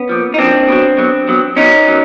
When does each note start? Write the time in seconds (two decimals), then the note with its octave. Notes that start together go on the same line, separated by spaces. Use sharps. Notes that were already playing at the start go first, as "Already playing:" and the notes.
Already playing: B3 C#4
0.09 A#2 F3
0.34 D#4
0.38 A#2 F3 C4 D4
0.69 B2 F#3
0.98 B2 F#3
1.28 B2 F#3
1.57 B2 F#3 C#4 D#4
1.87 F#3